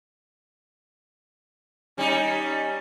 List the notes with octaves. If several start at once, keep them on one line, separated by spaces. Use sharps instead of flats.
G3 C#4 D#4